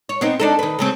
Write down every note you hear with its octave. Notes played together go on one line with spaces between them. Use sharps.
C#5
B3 C4 D#4
D4 D#4 A4
D#3 B4
C#3 A3 C4